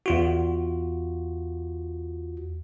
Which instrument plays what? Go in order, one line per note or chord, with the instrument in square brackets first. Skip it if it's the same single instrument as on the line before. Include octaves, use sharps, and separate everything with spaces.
[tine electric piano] E2 F4 F#4